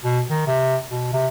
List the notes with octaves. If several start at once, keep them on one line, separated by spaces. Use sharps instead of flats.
B2
D#3
C3
B2
C3